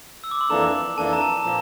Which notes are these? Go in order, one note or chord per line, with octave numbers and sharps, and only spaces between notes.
E6
D6
C6
F2 E3 A#3 D4 A4 A#5
F2 E3 A#3 D4 A4 A5
A#5
A5
A5
A#2 F3 A#3 A#5